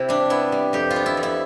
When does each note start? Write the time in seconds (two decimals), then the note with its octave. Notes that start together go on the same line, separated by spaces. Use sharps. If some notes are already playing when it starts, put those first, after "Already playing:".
Already playing: C3 E4
0.09 G3 D4
0.30 B3 E4
0.52 G3
0.73 F2 G4
0.90 F4
0.96 B3
1.06 E4
1.17 F2
1.23 E4